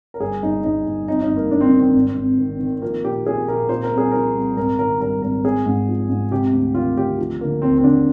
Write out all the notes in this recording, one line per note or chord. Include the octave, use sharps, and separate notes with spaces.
A#4
G1 G#4
G1 D#4
G1 D#4
G1
F2 D#4
D#4
G1
A#3
G1 D4
C4
D4
D#3
C4
G#1
G#1
D#3
D#3
F3 A#3
A#2 G4
F3 G#4
A#2 A#4
A#2 C5
A#4
C2
G#4
F3 A#4
C2
G#1 A#4
D#3 A#4
G2 A#4
G#1 A#4
G#1 G#4
G#2
F3
G#2
C3 G4
D2
D#3 F4
D2 G4
F3
D3 A#3
D#2 C4
C4
D3 D4